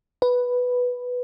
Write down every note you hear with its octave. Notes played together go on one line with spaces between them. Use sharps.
B4